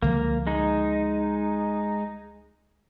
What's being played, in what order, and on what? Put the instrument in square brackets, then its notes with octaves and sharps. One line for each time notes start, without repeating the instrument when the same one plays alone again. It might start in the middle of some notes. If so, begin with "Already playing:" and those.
[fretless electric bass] C#2 D3 F3 [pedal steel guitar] A#3
[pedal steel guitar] G#3 D#4